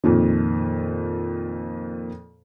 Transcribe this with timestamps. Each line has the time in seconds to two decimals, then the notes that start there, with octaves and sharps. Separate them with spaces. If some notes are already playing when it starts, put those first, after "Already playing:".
0.04 F2 A#2 D#3